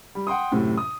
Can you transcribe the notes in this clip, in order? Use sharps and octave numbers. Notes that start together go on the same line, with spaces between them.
G3
F#5 G5 C6 D#6
F#2 A2 C3
D#6